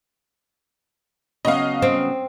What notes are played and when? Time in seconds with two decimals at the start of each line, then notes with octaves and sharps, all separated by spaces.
1.45 C#3 F#3 B3 C#4 D#5 F5 D#6
1.82 C4